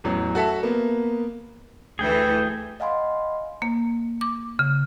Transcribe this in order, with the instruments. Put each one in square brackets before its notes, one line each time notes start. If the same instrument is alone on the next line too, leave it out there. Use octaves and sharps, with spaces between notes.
[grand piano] A1 E2 F#3
F#4 A4 E5 A5
A#3 B3
[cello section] D2 E3 A4 [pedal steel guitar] G#4 G5
[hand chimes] D#5 F5 F#5 G#5 B5 C6
[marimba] A#3
D6
C#3